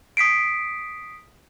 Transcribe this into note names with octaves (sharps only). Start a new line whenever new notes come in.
D#6 B6 C7 D7